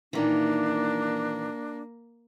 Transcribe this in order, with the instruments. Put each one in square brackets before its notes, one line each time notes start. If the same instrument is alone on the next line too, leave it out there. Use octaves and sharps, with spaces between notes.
[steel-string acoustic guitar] A#2 D#3 E3 [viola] A#3 [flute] D4